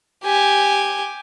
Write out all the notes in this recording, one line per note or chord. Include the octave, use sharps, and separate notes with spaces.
G4 G#5